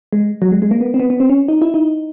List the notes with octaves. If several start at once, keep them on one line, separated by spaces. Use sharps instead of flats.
G#3
F#3
G#3
G#3
A#3
B3
C4
B3
B3
C4
C#4
D#4
E4
D#4